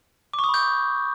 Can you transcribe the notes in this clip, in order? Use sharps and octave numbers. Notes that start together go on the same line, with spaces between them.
D6
C#6
D#6
B5
G6